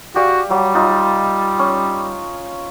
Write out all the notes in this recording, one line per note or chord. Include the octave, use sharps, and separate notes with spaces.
F#4 G4 D5 F5
F#3 G3
D#4 F4
C#4